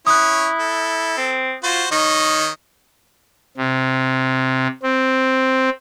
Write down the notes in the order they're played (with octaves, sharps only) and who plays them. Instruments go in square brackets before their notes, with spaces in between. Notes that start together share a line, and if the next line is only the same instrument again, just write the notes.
[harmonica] C#4 C#5 [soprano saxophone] E4 [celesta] D#6 F#6
[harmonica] A4
[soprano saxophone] C4
[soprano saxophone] F4 [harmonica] F#4 C5
[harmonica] D#3 C#5 D#5 [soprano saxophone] D#4
[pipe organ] C3
C4